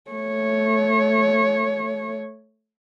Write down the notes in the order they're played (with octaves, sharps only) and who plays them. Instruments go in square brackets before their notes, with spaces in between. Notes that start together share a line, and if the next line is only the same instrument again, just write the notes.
[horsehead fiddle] A3 C#5